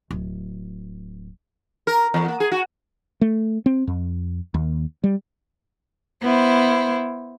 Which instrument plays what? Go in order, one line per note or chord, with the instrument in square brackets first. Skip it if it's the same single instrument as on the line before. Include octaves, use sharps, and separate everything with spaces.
[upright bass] D1
[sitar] A#4
E2
A#3
G#4
F#4
[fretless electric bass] A3
C4
F2
D#2
G3
[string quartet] B3 E4 C5